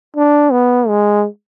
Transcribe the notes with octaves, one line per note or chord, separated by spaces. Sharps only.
D4
B3
G#3